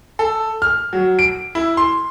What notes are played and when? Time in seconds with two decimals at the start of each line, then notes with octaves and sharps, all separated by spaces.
0.19 A4
0.62 F6
0.93 F#3
1.19 D7
1.55 E4
1.77 C6